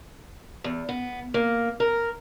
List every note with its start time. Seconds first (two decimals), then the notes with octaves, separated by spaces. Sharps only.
0.64 E2
0.89 B3
1.34 A#3
1.80 A#4